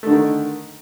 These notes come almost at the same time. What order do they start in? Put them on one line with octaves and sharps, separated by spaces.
A3 D3 D#3